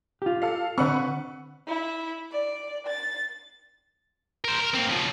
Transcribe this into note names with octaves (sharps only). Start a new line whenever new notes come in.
F4 G4
A4 F5
D3 C4 B4 F#5 C#6
E4
D5
A6
A#4 C5
A#4
A#3 C4
C#3 F3